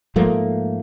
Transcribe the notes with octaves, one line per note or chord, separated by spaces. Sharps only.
G#2 F3 A3 A#3